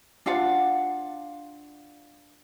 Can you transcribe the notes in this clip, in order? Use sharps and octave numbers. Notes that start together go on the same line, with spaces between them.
D4 F4 F5 F#5